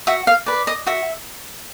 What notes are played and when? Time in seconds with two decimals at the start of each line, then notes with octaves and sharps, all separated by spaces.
0.07 F#4 E5
0.27 F5
0.46 B4 D5
0.67 D#5
0.87 F#4 E5